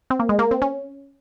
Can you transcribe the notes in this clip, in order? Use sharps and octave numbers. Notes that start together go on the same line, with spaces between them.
C4
A#3
G#3
A#3
C4
C#4